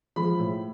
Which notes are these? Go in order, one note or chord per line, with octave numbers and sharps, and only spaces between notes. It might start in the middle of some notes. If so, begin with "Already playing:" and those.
F3 G#3 B5
A2